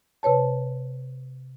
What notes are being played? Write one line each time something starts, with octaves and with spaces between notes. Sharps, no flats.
C3 B4 C#5 A5